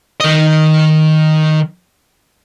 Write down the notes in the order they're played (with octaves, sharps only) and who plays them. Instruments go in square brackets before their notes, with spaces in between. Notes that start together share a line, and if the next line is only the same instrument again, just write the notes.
[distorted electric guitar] D#3 D#5